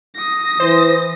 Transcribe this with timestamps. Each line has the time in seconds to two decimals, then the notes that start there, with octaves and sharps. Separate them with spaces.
0.16 D#6 A#6
0.60 E3 C5